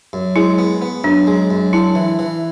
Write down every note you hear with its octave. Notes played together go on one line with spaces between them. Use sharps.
F#2
G#3 E4
B3
B3
F#2 D4
G#3
F#2
D4 E4
E3
E3